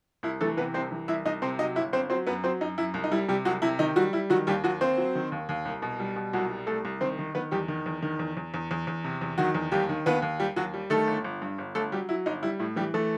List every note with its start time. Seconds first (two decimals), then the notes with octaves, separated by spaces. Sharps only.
0.23 C2 E4
0.41 E3 A3 A4
0.57 C3 B3 B4
0.74 C2 C4 C5
0.92 E3
1.08 C2 E4 E5
1.25 C2 D#4 D#5
1.42 C3 C4 C5
1.59 F#3 D#4 D#5
1.76 G1 E4 E5
1.93 G1 C4 C5
2.10 F#3 C4 C5
2.27 F#2 B3 B4
2.44 F#3 C4 C5
2.61 F#2 D#4
2.78 F#2 E4
2.94 C2
3.04 D#4
3.11 G3 E4
3.28 C3 G3 G4
3.45 C2 F#3 F#4
3.62 C3 E4
3.79 D#3 D#4
3.96 F#3 G3 F#4
4.13 G3 E4
4.30 D#3 F#3 F#4
4.47 D#2 G3 G4
4.64 D#2 F#3 F#4
4.81 D#2 C4 C5
4.98 F#3
5.15 D#3
5.32 D#2
5.49 D#2
5.65 C2
5.82 B2
6.00 G3
6.16 B2
6.33 C2 F#3 F#4
6.50 G3
6.67 C2 A3 A4
6.85 C2
7.01 D#3 C4 C5
7.19 D#3
7.35 D#3 B3 B4
7.51 E2 G3 G4
7.68 D#3
7.86 E2
8.02 D#3
8.19 E2
8.37 E2
8.54 E2
8.71 E2
8.87 E2
9.04 C3
9.21 E2
9.38 D#3 F#3 F#4
9.55 E2
9.72 D#2 G3 G4
9.89 D#3
10.06 D#2 B3 B4
10.22 D#2
10.40 G3 G4
10.56 D#2 F#3 F#4
10.74 G3
10.90 D#3 A3 A4
11.08 G1
11.24 G1
11.42 G2
11.58 G1
11.75 G1 A3 A4
11.92 F#3 G3 G4
12.09 F#3 E4
12.26 G1 D#4
12.43 G3 E4
12.59 A2 E4
12.76 E3 G3 G4
12.94 E3 A3 A4